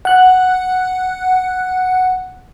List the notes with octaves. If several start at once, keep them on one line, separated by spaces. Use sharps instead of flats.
F#5 F#6